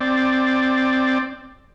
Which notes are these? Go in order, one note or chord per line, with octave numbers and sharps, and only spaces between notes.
C4 D5